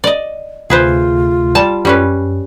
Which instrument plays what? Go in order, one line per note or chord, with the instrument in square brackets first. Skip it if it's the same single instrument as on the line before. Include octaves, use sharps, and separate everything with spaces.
[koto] D5 D#5
[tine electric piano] D2 C3 A3 [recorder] F4 [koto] G#4 B4 C5
[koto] G3 A5
[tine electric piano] F#2 [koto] G3 C#4 B4